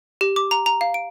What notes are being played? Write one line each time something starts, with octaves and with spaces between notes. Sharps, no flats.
G4
D6
A#5
A#5
F5
D7